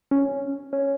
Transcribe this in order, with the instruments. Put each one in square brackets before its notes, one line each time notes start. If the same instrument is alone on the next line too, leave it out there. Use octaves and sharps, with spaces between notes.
[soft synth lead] C#4
C#4